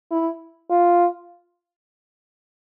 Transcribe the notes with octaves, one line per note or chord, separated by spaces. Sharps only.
E4
F4